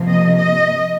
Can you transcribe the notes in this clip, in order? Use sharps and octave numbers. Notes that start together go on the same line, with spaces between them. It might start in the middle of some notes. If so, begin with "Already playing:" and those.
Already playing: C3 F3 A#3
D#5
D#5